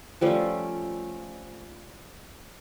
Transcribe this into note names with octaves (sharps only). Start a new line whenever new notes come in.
F3 G3 A3 C#4